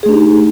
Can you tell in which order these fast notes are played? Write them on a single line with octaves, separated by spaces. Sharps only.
G#4 A3 D4 G4 D#4